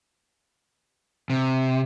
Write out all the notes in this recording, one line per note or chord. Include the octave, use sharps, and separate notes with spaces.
C3